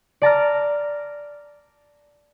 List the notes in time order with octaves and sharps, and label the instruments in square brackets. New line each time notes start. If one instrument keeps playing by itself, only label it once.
[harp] D5 A5 A#5 F6